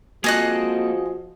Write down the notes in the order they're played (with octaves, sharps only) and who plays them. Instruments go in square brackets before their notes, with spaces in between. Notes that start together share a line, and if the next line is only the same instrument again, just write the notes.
[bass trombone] F3 [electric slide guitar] A#3 C4 A4 [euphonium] F#4 [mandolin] G#4 D#5 F#6